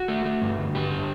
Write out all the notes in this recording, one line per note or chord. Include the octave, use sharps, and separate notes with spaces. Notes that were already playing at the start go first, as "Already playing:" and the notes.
Already playing: F#4
A3
A3
G2
D3
G2 G4
D3